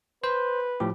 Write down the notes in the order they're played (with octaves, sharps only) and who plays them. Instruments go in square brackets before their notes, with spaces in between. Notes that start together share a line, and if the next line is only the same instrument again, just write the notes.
[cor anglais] B4 [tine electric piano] C5
[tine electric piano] A2 F3 G4